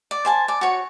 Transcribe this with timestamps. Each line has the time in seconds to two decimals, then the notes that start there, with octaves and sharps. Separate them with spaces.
0.11 D5
0.25 C5 G#5 A5
0.48 D5
0.61 F#4 C#5